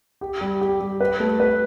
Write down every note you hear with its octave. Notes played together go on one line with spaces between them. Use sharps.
G4
G3
G4
G3
B4
A3
B4